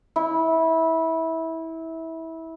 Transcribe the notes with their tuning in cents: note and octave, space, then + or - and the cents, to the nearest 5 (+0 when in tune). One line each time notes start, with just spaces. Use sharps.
E4 -20